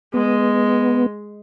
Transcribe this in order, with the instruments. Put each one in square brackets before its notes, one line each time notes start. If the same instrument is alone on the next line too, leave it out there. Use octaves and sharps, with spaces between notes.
[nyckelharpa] G#3 [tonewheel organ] B3